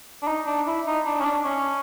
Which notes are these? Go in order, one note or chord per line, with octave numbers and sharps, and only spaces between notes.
D4
D#4
D4
E4
D#4
D4
C#4
D4
C#4